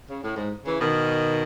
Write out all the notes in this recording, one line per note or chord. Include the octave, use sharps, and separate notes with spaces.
C#3
A2
G#2
C#3 E3
B2 D#3